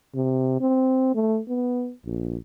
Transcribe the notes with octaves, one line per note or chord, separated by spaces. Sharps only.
C3
C4
A3
B3
A#1